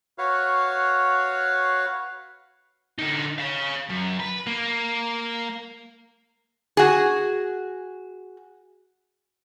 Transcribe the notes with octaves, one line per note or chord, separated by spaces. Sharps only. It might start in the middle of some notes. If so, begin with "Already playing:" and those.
F#4 B4 C#5 F5
D3 D#4
C#5 F5
F#2
B4
A#3
F#4 G#4